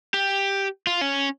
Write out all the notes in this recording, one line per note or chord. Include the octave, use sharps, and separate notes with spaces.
G4
F4
C#4